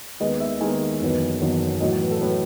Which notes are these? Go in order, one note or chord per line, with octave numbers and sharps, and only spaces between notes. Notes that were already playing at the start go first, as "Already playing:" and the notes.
D#2 D#3 G#3 B3 D#5
E5
D#2 D#3 G#3 B3 G#5
F#1 E2 D#3 F#3 B3
F#1 E2 D#3 F#3 B3
A1 A2 F#3 D#5
B4
A4
A2 F#3 B4